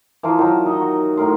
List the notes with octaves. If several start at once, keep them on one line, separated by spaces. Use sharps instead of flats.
E3 F3 A#4 C6
D#3 F#3
D#4 D#5
F#4
A2 A#4 C6